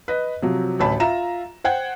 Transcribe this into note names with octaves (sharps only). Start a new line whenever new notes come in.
B4 D#5
C3 F3 F#3
A1 D2 A5 B5
F4 E5 A#5 E7
C5 F#5 G5 G#6